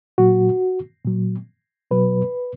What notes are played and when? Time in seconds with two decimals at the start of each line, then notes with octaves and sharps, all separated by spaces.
0.18 A#2 F#3 F#4
1.05 A#2 F#3
1.91 B2 F#3 B4